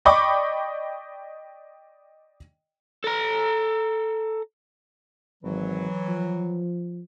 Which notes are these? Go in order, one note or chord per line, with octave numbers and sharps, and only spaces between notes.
D5 D#5 G5 B5 C#6 D6
A4 A#5
G#1 E3 F#3
F3